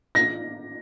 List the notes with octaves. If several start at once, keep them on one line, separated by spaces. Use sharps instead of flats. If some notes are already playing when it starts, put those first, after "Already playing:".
A#6